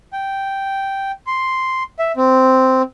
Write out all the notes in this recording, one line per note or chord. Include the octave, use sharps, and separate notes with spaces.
G5
C6
E5
C4